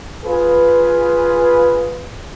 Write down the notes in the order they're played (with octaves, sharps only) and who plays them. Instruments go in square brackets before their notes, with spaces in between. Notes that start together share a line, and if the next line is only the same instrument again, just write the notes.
[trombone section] F4 G#4 B4